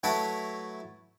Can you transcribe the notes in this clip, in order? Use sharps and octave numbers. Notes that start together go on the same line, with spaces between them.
F#3 A3 E4 F#4 B4 A5